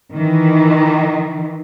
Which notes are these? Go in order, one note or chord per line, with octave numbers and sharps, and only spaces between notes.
D#3 E3